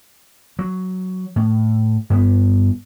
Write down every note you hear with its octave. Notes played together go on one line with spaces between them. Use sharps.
F#3
A2
G2 B3